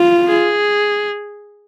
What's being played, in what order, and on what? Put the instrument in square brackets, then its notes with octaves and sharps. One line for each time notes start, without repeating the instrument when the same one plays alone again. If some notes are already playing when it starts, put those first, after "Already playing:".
Already playing: [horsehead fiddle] F4
[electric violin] G#4